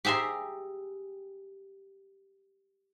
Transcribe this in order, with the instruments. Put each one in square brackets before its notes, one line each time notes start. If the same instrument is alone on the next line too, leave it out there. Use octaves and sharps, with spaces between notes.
[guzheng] G4 G#4 E5 A#5 C6